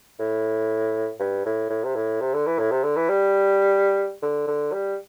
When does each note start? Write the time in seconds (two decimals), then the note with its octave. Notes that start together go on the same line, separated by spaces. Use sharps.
0.20 A2
1.20 G2
1.46 A2
1.70 A2
1.84 C3
1.96 A2
2.21 C3
2.34 D3
2.47 E3
2.59 A2
2.72 C3
2.84 D3
2.97 E3
3.10 G3
4.22 D3
4.47 D3
4.73 G3